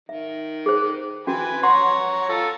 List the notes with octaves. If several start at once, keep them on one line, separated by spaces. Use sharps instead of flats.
D#3 E5
G#4 C5
C#4 F#4 B4 G#5
C#5 F#5 A#5 C6
F4 A4